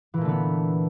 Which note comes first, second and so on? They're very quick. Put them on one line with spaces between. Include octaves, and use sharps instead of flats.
E3 A#2 A3 D3 B3